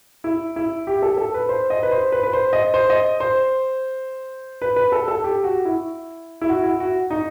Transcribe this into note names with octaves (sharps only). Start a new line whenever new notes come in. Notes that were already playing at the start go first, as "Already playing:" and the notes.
E4
E4
G4
A4
A4
B4
C5
D#5
B4
C5
B4
B4
C5
D#5
C5
D#5
C5
B4
B4
A4
A4
G4
F#4
E4
E4
F#4
E4
F#4
D#4